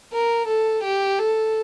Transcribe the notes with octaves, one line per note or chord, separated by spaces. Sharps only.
A#4
A4
G4
A4